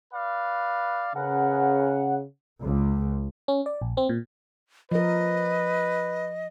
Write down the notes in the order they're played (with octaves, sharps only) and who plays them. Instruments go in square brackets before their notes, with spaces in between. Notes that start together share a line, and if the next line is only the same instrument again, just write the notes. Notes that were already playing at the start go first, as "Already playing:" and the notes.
[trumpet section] B4 D5 F5
[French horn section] C#3 [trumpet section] G#4 A#4 B4 [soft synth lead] F#5
[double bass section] C#2
[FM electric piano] C#4
D5
A#1
C4
A#2
[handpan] F3 A#4 [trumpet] B4 [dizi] D#5